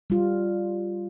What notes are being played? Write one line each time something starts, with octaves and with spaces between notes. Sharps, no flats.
G3 F4